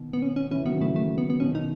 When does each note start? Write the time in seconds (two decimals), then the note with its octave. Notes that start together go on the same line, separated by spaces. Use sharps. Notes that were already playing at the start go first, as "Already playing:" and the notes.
Already playing: B2 D#3
0.13 B3
0.22 C#4
0.36 C#4
0.51 C#3 E3 C#4
0.66 D#3 F#3 B3
0.80 C#3 E3 A3
0.96 A3
1.18 B3
1.30 B3
1.40 B2 D#3 C#4
1.55 D#4